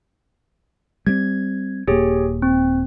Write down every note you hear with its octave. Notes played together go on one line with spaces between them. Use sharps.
G3 G#3 C4 G#6
D#1 A#3 G4 G#4 C#5
C4